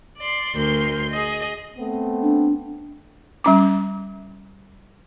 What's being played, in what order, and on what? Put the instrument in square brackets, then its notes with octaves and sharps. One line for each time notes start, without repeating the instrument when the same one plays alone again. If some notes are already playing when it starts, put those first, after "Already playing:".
[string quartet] D5 C6
D2 A#4 C6 G6
G#4 D#5
[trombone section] A3 B3 C4
[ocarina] D4
[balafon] G3 C#4 D6